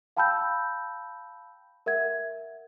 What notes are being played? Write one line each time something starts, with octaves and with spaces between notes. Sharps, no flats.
F5 G5 A5 B5 E6 G6
A#4 E5 F#5 G#6